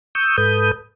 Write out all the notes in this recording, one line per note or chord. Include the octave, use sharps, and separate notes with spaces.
C#6 D#6 E6 G6
G#2 A4 B4 D#6 G6